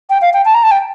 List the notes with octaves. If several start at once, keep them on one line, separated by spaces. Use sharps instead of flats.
G5
F5
G5
A5
A#5
A5
G5